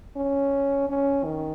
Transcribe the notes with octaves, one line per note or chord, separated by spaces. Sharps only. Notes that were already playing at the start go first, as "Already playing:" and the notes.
C#4
C#4
D#3